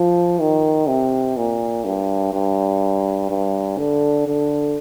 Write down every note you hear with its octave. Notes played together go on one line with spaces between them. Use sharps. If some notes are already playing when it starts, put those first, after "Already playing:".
Already playing: F3
D#3
C3
A#2
G2
G2
G2
D3
D3